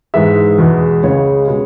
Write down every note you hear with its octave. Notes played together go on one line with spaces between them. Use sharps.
G#2 E3 G#3 E5
E2 B2 G#3
C#2 C#3 G#3 C#5
B2 G#3